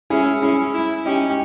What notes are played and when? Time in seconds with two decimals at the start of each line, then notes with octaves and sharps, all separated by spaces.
0.10 C#4 E4 G#4
0.42 C#4 E4 G#4
0.74 E4
1.05 C#4 D#4 G4
1.30 G4